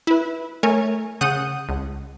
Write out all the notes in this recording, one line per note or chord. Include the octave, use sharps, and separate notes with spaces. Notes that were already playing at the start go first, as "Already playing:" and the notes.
E4 B4
A3 A#4 C#5 G#5
C#3 F#5 D#6 G6 D#7
C#2